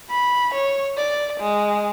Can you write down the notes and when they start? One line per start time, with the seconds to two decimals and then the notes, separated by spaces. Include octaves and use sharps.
0.10 B5
0.54 C#5
0.97 D5
1.41 G#3